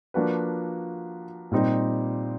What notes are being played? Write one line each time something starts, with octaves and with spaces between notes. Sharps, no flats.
F3 A#3 D4 F#4 B4
A#2 G3 C4 D#4 G4